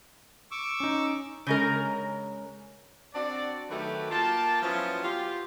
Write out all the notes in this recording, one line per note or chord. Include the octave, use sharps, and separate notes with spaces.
C#6 D6 E6
C#4 D#4
C#3 G#3 A#4
C4 D4 F#4 D5
D#3 F#3 A3 G4 A4 B4
A#3 F4 G5 A5
F3 F#3 B3 C#4 E4 F4
F4 G4